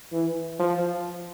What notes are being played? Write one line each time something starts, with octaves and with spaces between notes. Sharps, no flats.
E3
F3